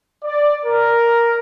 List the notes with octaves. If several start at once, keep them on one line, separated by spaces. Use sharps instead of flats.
D5
A#4